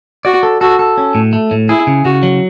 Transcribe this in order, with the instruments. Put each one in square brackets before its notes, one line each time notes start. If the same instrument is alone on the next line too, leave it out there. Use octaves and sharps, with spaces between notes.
[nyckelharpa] F#4 [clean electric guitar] D5
[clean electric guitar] A4
[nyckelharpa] F#4 [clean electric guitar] A4
[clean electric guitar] A4
C#4
A2
A3
A2
[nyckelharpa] E4 [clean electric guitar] G#4
[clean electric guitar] C#3
[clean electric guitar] C#3 [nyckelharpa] F#4
[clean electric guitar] F#3